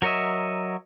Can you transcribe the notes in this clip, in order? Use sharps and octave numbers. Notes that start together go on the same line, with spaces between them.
F#3 A#4 C#5 D#5 E5